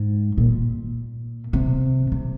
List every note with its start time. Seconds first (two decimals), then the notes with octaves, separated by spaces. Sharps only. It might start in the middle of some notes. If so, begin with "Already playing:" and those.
Already playing: G#2
0.38 A#2
1.53 C3
2.12 C3